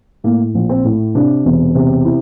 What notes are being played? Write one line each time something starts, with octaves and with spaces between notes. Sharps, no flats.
A2 A#3
A#1
C4
A2
C3 D4
E1
C3
E4